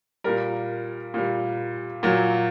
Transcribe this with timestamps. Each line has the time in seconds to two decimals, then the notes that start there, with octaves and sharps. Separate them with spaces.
0.24 A#2 G3 A#4
1.14 A#2 G3
2.03 A#2 F#3